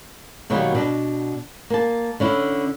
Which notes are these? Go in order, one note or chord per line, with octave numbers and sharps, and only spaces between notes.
B2 D#3 F#3 G3 A#3 B3
B2 D4
A#3 A5
D3 C#4 E4